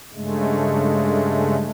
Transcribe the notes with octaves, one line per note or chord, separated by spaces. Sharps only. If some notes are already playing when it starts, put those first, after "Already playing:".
G2 C#3 G#3 A3